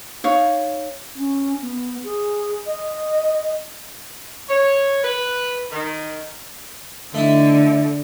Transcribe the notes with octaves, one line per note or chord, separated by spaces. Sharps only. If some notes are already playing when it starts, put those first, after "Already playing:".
D#4 C#5 F5
C#4
B3
G#4
D#5
C#5
B4
D#3
D3 A3 D#4 E4